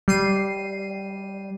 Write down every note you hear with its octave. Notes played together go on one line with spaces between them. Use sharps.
G3 C7 D#7